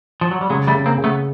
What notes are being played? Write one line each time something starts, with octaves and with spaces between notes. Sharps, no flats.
F3
F#3
G3
C#3 F#3 G#3
G3 A3
C#3
A#3 C4
C#3
A3 B3